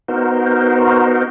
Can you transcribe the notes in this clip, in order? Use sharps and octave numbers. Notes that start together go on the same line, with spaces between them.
B3 D#4 F#4 A#4 C5